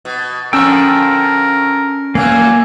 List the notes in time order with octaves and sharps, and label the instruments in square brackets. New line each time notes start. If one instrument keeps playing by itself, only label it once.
[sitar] B2
[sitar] D3 F3 [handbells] C#4 E6 [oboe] A#4 [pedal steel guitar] G5 A5 C#6
[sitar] F#2 E3 F#3 [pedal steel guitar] A#3 F5 [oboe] G#5